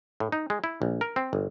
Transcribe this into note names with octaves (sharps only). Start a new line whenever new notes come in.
A2
D#4
G#3
E4
A#1
A#4
C4
G1